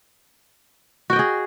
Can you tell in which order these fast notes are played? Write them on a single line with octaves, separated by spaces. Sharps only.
F#4 G5 D#5 G#4